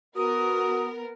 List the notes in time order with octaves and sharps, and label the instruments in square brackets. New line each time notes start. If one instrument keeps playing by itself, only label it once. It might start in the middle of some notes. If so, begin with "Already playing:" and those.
[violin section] B3 A#4 [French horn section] F#4 [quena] D#6